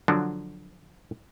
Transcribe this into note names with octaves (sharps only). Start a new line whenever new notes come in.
D3 F3 F#3 D4 F#4